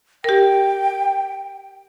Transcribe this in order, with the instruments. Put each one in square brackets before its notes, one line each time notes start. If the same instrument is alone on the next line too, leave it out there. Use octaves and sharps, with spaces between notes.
[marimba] G4 A#4 [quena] G5